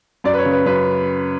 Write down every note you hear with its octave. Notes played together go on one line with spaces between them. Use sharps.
F#2 D5
B4
C#5
C#3
B4
F#2 B4